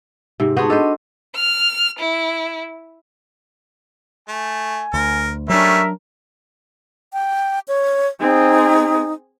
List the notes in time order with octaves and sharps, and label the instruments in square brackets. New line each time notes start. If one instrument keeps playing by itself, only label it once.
[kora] G#2 C3
[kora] B3 F#4 C5 [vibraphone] D#4 G#4 A5
[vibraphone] D4 D#5 [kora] A4 B4 C5
[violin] F6
E4
[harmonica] A3 [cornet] G#5
[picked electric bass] D2 [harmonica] A#4
[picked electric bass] F#3 D4 [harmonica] G3 A3 C#4 [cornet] A#4 [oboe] E5
[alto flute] G5
C#5
[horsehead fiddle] C4 G#4 [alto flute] D#4